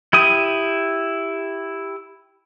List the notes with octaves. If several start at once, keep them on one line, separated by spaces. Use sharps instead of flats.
E4 G4 D#6